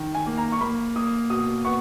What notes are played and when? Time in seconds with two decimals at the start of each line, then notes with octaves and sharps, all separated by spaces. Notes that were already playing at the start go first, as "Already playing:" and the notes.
Already playing: D#3
0.15 G#5
0.26 A#3
0.38 A#5
0.52 C#6
0.61 A#3 B5
0.96 A#3 D#6
1.30 B2 D#6
1.65 B3 C#6